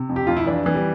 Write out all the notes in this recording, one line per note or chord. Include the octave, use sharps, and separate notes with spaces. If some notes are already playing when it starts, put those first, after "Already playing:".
Already playing: C3
F2
G4
F2 F4
E4
E3 D4
E3
G3